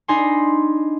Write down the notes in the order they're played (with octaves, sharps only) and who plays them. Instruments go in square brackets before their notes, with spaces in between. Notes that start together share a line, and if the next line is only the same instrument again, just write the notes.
[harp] D4 D#4 D#5 G#5 B5 C6